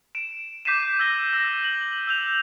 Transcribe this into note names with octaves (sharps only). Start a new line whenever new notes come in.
D7 E7
D6 G6 B6 C7 D#7 E7
E6 G#6 A#6 G7
E6 A#6
F#7
E6 G6 F7